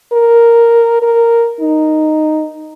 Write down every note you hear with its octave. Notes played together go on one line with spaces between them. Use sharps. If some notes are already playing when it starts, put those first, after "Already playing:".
A#4
A#4
D#4